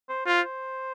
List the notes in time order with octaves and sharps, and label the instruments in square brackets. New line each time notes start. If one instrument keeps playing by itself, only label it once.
[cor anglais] C5
[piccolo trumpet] F4 [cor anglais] C5